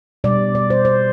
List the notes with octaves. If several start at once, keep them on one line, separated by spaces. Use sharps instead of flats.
B2 G3 D5
D5
C5
C5